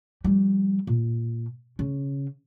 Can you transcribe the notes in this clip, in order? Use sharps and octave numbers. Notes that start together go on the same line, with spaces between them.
F3 G3
A#2
C#3